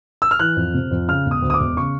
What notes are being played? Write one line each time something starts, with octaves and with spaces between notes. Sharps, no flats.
E6
F6
E3 F#6
F2
C3
F2
C#3 F6
E1
D#6
D2
D#6
D6
E1
C#3 C#6